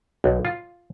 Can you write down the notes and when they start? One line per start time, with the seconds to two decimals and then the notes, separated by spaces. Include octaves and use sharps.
0.24 B1
0.45 F4